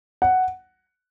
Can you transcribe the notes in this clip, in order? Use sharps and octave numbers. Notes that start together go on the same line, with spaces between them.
F#5